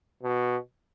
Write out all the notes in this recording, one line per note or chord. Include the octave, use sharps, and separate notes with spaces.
B2